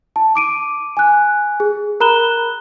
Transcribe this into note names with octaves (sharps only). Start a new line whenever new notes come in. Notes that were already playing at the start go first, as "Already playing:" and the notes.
A5
D6 D7 D#7
G#5 F#6
G#4
A#4 A#5 B5 F#6 E7 G7